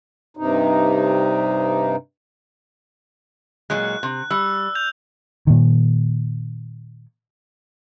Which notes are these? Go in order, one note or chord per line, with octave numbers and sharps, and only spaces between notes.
G2 C3 D#4
A#2 F#3 G#3 F#6
C3
G3 E6
G6 F7
A#2 D#3